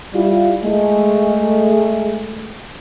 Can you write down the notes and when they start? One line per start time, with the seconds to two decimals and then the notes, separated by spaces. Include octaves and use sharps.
0.14 G3 E4 F4
0.63 G#3 A3